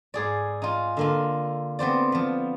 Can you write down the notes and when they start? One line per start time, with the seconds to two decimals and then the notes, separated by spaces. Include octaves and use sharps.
0.14 G#2 G#4 D5
0.62 D#4 F4
0.97 D3 A#3 F4
1.79 B3 C4 C5 D5
2.12 F3 B3